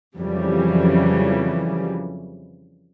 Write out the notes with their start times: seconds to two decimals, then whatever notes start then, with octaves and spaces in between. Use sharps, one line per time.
0.17 F2 C#3 E3 F#3 G3